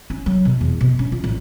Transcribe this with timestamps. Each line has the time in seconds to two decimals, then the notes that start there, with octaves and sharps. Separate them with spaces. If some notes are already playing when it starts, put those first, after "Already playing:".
0.10 C#4
0.26 F#3
0.45 B2
0.61 E2
0.81 B2
0.99 C#4
1.12 F4
1.24 A1